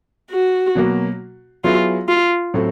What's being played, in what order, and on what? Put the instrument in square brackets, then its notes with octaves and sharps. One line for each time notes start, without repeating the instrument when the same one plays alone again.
[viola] F#4
[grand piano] B2 F#3 A#3
[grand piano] F#3 B3 E4 G#4 [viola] F4
[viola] F4
[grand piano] A2 F#3 A3 C4